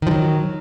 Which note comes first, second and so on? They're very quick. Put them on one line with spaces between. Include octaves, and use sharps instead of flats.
D#3 F3 F#3